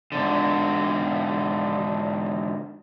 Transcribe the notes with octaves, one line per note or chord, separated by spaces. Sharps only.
G#2 D3